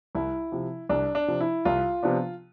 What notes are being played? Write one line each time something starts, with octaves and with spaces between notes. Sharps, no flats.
C2 E4
C3 F3
C2 D4
D4
C3 F3
E4
C2 F4
C3 F3 B3 D4